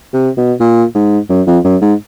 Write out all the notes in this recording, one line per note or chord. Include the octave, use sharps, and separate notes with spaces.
C3
B2
A#2
G#2
F#2
F2
F#2
G#2